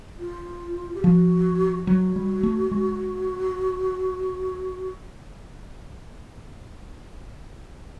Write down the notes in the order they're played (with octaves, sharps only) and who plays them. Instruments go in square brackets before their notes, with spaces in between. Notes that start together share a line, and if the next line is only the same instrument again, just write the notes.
[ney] F4
G4
[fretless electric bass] F3 [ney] F#4
[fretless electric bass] F#3 [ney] F#4
[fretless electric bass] G3
A3
G#3